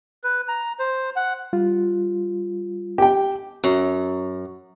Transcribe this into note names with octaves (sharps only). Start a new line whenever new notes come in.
B4
A#5
C5
F#5
G3 F4
G4 G5
F#2